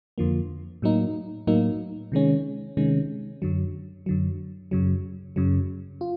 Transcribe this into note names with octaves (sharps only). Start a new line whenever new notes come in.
F2 D3 F3 A#3
A2 F#3 A#3 D#4
A2 F#3 A#3 D#4
C3 D#3 G#3 C#4
C3 D#3 G#3 C#4
F#2 D3 F#3
F#2 D3 F#3
F#2 C#3 F#3
F#2 C#3 F#3
F4